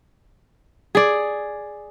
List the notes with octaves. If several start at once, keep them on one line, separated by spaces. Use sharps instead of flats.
G#4 D5